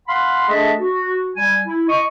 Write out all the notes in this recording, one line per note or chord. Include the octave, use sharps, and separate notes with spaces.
F5 F#5 B5 C6
A3 D4 G#4 A4 D#5 E5
F#4
G3 G#5
E4
D#5 C#6